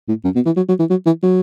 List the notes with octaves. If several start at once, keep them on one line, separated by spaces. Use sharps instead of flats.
A2
F#2
B2
E3
F#3
F#3
E3
F#3
E3
F#3